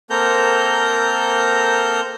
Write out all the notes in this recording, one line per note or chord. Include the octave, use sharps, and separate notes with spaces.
A#3 C4 A4 A#4 A#5 G6